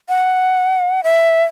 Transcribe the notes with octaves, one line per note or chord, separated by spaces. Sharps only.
F#5
E5